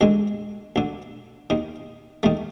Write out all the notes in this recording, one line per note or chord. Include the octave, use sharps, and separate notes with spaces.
D2 D3 G#3
D2 D3
D#2 D#3
D#2 D#3 A3